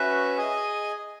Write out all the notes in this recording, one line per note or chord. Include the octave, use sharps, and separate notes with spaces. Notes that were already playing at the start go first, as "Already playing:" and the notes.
Already playing: C#4 F#4 B4 E5
G#4 D#5 G#5